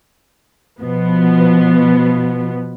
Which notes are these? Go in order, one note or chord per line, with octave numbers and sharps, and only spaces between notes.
B2 F3 B3